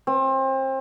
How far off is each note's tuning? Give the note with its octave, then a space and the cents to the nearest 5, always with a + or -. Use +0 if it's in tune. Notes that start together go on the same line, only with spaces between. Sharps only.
C4 +30